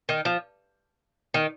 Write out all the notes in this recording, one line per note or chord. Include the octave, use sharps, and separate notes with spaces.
D#3
F3
D#3